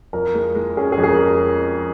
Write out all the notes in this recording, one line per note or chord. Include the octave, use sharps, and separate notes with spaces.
F2 A#4
G#3
G#3
C#4 G#4
G#4
F2
G#4
A#4